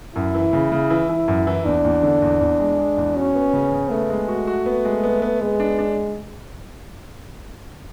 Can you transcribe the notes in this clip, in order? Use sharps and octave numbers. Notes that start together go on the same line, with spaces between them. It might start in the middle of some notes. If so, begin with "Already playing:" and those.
F#2 E4
E3
C#3
C#3
E3
E3
F#2
E3
E2 D4
E2
D3
E2
E2
G#3
G#3
E2
C#4 F#4
B3
C#3
C#3
A3 B3
G#3
F#4
F#4
B3
G#3
B3
B3
G#3 B3
D4
D4